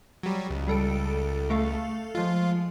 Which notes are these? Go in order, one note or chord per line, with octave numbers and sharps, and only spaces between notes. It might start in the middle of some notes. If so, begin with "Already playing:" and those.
F#3 G3
C#2
G3 A4 D7
A3 A4 F5
F3 G#3 F4